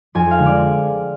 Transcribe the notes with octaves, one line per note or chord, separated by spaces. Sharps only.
F2 G#5
F5
D3 G#3
D5